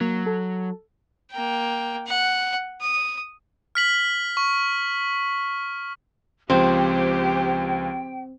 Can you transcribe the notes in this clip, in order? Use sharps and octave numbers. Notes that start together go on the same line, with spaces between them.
F#3 A#3
A4
A#3 G5
F#5
D#6
F6 B6 F#7
C#6
C#2 F3 C4 G4 C5 G5